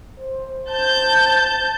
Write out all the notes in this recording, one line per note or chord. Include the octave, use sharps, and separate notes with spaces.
C5
A5 G6